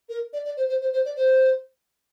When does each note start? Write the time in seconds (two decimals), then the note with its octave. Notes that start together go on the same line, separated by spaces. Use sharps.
0.09 A#4
0.33 D5
0.45 D5
0.57 C5
0.69 C5
0.81 C5
0.93 C5
1.05 D5
1.17 C5